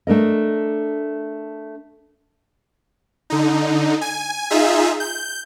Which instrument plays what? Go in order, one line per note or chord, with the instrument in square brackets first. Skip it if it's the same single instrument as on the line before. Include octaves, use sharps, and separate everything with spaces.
[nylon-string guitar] A3 D4 A#4 D#5
[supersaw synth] D3 D#4
G#5
D#4 F4 G#4 E5
G6